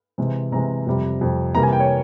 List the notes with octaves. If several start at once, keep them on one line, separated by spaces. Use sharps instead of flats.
C3 E3 G#3
C3 E3 G#3 A#5
F2 C3 G3
F2 C3 G3
C3 E3 G3 A#3 A#5
G#5
G5
C#5